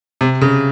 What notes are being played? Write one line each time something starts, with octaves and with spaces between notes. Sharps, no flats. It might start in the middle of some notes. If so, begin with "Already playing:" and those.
C3
C#3